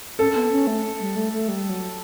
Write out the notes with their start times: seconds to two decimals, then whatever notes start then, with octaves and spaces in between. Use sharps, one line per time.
0.19 C#4 A4
0.31 C#4
0.36 B3
0.52 C#4
0.67 A3
1.00 G3
1.16 A3
1.32 A3
1.48 G3
1.69 F#3